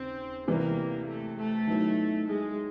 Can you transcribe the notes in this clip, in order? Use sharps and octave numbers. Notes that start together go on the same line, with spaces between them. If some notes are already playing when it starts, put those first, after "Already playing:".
Already playing: D#2 C#3 C4
C3 E3 G3 A#3
A3
A3
D#3 F#3 B3 E4
G#3